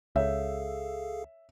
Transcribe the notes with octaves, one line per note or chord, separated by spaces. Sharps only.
C#2 G#4 A4 C#5 E5 F5